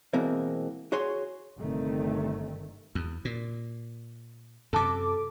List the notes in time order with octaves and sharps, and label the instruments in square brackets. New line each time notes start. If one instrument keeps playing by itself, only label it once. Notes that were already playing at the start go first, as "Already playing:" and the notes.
[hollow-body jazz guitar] B2 E3 G#3 A#3 C4
F#4 G#4 C#5 G#5 C6
[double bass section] G1 C3 D#3 A3
[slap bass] E2
A#2
[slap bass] F#2 C3 [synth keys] A4 A5 D6